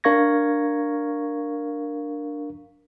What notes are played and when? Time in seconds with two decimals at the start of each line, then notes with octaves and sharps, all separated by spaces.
0.04 D4 A#4 F5 C#6 G#6 A#6